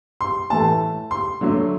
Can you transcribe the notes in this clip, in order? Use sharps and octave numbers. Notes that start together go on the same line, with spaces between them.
C6
A2 E3 A3 A5
C6
D3 F#3 A3